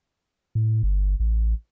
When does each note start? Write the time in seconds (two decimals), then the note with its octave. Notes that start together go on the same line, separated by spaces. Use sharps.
0.55 A2
0.83 G1
1.20 A1